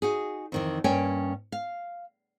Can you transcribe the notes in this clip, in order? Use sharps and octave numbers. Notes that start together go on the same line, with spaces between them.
D#4 F#4 G#4
F2 D#3 E3
G2 A#3 C#4 C#5 G5 G#5
F5